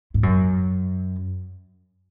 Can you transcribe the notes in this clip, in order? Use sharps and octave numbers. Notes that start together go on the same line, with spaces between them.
G#2
F#2